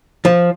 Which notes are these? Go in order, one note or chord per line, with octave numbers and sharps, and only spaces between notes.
F3